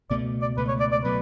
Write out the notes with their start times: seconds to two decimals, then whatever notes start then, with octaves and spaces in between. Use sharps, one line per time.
0.10 C#2 B2 A3 D5
0.42 D5
0.57 C#2 B2 A3 B4
0.68 C#5
0.80 D5
0.92 D5
1.04 B2 F#3 A3 B4